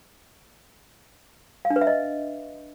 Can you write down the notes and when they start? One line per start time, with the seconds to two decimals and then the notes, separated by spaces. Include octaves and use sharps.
1.65 F5
1.70 D4
1.76 B4
1.81 E5
1.87 D#5